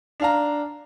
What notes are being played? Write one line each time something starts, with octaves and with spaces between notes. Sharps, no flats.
D4 F5 A#5